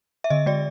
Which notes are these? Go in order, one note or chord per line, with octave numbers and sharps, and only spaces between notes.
E5
D3 D#5
G#3 D5